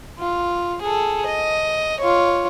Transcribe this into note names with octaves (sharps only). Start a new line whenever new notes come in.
F4
G#4 A4
D#5
F4 C#5